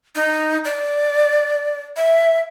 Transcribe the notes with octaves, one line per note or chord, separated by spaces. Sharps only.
D#4
D5
E5